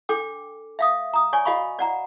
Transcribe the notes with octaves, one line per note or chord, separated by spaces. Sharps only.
D4 A4 G5 D6
E5 F5 D#6
A#5 D#6
C#5 D5 G#5 C#6
F#4 D#5 F5 B5 C#6
D5 F#5 A#5